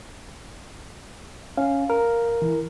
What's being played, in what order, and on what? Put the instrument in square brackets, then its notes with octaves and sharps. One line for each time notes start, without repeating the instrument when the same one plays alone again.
[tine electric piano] C#4 [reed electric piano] F5
[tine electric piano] A#4
[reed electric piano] E3